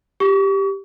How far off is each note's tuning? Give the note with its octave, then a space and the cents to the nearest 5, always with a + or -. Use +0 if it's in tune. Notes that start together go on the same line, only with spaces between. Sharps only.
G4 +0 C#6 +40